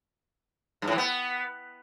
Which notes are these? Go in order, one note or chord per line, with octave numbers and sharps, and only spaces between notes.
G2
A2
E3
B3